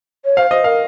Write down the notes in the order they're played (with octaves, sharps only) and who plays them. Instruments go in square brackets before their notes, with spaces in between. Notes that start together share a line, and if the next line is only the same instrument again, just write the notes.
[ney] C#5
[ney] C5 [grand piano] F5
[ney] C5 [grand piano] D#5
[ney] A#4 [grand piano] F5